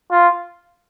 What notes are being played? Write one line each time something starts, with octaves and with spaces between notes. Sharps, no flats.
F4